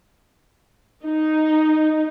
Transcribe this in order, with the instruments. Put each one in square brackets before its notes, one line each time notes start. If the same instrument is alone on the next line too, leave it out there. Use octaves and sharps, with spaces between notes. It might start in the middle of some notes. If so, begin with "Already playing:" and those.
[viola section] D#4